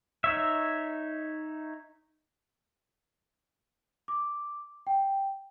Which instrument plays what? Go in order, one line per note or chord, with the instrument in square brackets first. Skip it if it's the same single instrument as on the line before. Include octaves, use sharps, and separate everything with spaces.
[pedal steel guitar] D#4 C#5 E5
[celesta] D6
G5